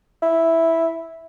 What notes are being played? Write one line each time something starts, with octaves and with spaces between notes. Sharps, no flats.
E4